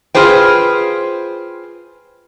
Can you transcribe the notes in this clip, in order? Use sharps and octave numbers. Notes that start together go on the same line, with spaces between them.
F4 G#4 B4 C5 G5